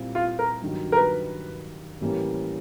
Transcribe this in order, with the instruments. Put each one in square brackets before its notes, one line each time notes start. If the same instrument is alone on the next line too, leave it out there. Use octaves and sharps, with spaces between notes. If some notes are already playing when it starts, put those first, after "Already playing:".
Already playing: [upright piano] A#2 G3 C4 E4
[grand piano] F4
A#4
[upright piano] G2 D#3 F#3
[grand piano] A#4
B4
[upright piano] A2 E3 G3 A#3 C#4